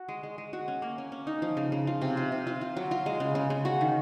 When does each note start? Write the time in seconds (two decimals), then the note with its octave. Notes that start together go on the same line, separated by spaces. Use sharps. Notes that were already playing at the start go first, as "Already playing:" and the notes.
Already playing: F#4
0.09 G#3
0.23 G#3
0.38 G#3
0.53 F#4
0.68 C#4
0.82 A#3
0.98 C#4
1.12 C#4
1.27 D#4
1.42 F3
1.57 C#3
1.72 C#3
1.87 F4
2.02 C3
2.17 F4
2.32 C3
2.47 F4
2.61 F4
2.77 F#3
2.91 F4
3.06 G#3
3.20 C#3
3.35 C#3
3.50 C#3
3.65 F#4
3.81 D#3